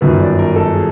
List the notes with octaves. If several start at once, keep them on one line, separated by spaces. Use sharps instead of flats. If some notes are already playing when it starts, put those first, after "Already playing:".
G1 F#2 D#3 B4
D5
A#4
A4
G#4